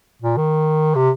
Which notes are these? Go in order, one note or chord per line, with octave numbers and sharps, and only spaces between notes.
A#2
D#3
C3